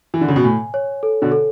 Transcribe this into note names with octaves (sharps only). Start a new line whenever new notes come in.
E3
D3
C#3
B2
A2 G#5
C#5
A4
B2 D3
A4